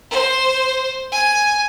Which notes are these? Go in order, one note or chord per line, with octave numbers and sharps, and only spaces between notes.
C5
G#5